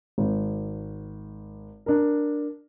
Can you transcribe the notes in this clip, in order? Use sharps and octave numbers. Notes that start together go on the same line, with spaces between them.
G#1
D4 A#4